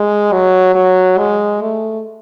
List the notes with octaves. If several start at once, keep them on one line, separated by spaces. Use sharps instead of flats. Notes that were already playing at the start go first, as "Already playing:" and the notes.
Already playing: G#3
F#3
F#3
G#3
A3